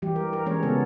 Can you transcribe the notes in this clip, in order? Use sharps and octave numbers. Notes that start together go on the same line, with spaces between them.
E3 G3 G4
A#4
A#4
E3 G#3 C#4 A#4 C#5
C#3 B3 A4